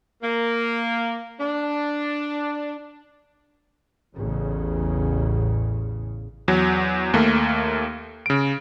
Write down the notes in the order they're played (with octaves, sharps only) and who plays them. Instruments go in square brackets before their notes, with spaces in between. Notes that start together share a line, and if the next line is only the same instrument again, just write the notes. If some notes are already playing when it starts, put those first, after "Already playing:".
[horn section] A#3
D4
[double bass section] A1 E2 C#3
[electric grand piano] E2 F#3
D#2 A3 A#3
C#3 D7